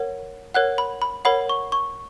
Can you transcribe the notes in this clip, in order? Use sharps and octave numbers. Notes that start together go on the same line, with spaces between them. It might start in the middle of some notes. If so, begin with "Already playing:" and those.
Already playing: A#4 C#5 F#5
A#4 C#5 F#5 F#6
B5
B5
A#4 C#5 F#5 B5
C#6
C#6